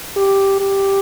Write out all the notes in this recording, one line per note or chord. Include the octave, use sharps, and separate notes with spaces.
G4
G4